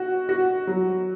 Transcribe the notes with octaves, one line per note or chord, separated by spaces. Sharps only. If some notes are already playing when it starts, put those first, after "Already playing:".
Already playing: F#4
F#4
F#3